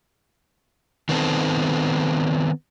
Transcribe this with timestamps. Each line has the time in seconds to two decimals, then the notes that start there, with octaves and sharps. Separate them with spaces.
1.09 D#3 B3 C4 A4